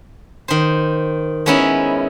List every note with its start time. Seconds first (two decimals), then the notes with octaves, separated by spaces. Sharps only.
0.48 D#3 C5
1.46 G#3 B3 C#4 D#4 E4